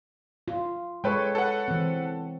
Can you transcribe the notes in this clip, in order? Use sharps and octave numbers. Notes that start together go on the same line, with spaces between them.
F4
G#3 A4 B4 C#5 G5
A4 B4 F#5
E3 C4